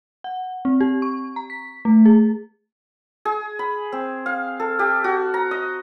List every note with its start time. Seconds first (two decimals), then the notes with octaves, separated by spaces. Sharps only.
0.24 F#5
0.65 C4
0.81 G4
1.02 C#6
1.36 A#5
1.50 B6
1.85 A3
2.06 G#4
3.25 G#4
3.59 B5
3.92 C4
4.26 F5
4.60 A4
4.79 G4
5.04 F#4
5.34 A#5
5.51 D#5